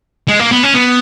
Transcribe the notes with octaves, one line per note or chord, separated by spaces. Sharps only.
G#3
A#3
B3
C#4
B3